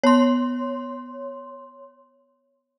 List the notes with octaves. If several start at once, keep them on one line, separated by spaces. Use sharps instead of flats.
B3 C#5 C6